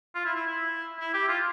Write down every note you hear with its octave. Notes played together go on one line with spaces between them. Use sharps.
F4
E4
E4
E4
E4
G4
F4